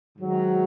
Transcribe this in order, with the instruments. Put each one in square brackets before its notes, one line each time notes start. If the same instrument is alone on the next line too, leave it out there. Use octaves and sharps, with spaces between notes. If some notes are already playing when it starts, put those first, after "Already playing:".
[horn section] G#2 D#3 F#3